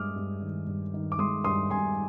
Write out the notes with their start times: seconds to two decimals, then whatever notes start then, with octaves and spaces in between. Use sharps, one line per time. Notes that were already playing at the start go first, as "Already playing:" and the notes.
Already playing: G2 G#3 D6 D#6 F6
0.16 G2
0.42 D#3
0.67 G2
0.94 D#3
1.12 D6
1.19 G#3 C6 D#6
1.44 G2 C6 D#6
1.70 G2 G#5 C6